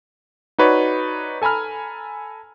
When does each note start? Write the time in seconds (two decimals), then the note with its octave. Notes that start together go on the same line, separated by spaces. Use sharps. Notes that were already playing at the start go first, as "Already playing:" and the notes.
0.59 D#4 F#4 B4 C#5 D5
1.42 A4 G#5 A#5 B5 F6